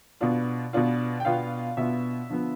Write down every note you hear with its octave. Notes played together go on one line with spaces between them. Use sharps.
B2 B3 D4 F4
B2 B3 D4 F4
G5
B2 B3 D4 F4 F5
B2 B3 D4 F4 E5
D3 F3 B3